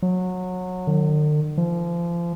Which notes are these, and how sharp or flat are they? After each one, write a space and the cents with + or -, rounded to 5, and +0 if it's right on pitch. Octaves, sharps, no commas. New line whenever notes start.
F#3 -20
D3 +45
F3 -30